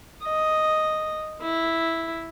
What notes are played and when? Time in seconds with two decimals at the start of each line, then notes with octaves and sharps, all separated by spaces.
0.23 D#5
1.42 E4